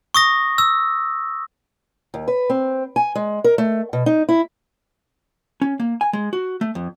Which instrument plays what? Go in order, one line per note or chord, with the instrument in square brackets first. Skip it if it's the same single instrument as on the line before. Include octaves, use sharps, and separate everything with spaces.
[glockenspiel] C#6 D#6 A#6
E6
[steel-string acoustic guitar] D#2
B4
C4
G#5
G#3
A#4
A3
B2
D#4
E4
[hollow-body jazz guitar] C#4
A#3
G#5
G#3
F#4
A3
F2